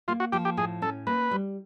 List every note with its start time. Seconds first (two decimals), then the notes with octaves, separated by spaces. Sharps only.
0.08 A#3 F4
0.20 F#4
0.32 F3 G4
0.45 G4
0.57 A2 G#4
0.82 C#4 A4
1.07 A#3 B4
1.31 G3